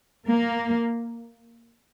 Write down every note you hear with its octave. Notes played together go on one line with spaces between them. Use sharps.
A#3